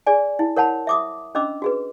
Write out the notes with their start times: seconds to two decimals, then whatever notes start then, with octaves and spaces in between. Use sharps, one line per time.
0.07 G#4 D5 G#5
0.39 E4
0.56 A#4 C#5 F#5 A5 B5
0.87 E5 D6 D#6
1.35 C#4 D4 D#5 B5 D6 E6
1.62 F#4 G#4 B4